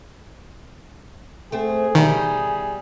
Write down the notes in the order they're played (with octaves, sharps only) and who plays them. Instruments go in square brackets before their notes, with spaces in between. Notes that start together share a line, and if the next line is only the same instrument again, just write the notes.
[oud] A3 C4 [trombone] G#4
[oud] B2 G3 E5 [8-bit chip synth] D#3